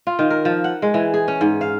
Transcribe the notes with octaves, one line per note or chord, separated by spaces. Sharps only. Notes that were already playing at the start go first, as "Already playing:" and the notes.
F4
D#3
A#4
F3
F#5
G#3
E3
G#4
C#4
G#2
F5